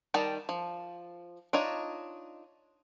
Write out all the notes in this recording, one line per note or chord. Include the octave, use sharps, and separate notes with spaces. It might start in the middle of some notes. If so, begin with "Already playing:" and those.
D#3 G3 D#4 A5 A#5
F3
D4 D#4 F4 C#5 D#5